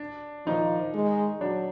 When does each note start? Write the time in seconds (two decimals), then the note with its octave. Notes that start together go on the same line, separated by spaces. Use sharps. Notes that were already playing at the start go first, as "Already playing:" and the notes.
Already playing: D4
0.47 D#3 F3 D#4
0.94 G#3
1.41 F#3 D4